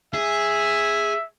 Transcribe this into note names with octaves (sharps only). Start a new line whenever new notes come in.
G#4 E5